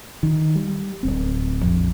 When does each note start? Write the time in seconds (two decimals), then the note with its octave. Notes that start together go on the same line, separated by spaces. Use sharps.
0.23 D#3
0.56 G3
1.03 D1 G1 C4
1.62 A#1 F2